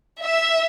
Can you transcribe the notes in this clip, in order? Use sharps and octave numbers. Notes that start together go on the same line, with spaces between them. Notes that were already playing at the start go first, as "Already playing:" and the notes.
E5